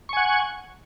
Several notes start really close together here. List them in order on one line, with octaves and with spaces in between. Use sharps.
C#6 G#5 F#5